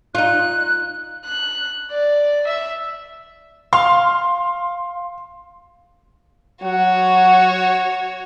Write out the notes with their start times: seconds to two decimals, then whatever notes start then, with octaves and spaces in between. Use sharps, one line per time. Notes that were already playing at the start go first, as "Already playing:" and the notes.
0.15 D#4 F4 F#6
1.25 F#6
1.91 D5
2.47 E5
3.73 F5 C6
6.63 F#3 F#4 C#5 F#5